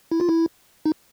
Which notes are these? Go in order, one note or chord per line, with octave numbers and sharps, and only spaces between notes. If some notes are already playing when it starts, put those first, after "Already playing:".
E4
F4
E4
D#4